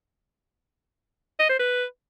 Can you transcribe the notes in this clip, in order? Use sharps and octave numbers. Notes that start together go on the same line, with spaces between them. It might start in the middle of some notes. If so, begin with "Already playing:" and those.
D#5
C5
B4